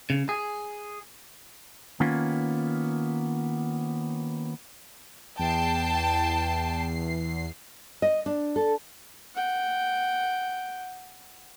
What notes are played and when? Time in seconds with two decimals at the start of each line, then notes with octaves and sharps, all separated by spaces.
0.10 C#3
0.29 G#4
2.00 D#3 A#3 B3 C#4 F4
5.39 E2 G5 A5 C7
8.02 D#5
8.26 D4
8.56 A4
9.35 F#5 G5